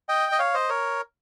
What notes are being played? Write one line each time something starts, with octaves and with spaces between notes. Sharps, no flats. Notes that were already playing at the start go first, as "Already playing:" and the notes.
D#5 G5
D#5
C#5 F5
C5 D#5
A#4 C#5